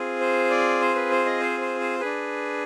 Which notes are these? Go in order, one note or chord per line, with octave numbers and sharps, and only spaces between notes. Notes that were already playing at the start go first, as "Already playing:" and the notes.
Already playing: C4 F4 G#4
C5
D5
C5
B4
C5
D#5
C5
C5
C5
D4 G#4 B4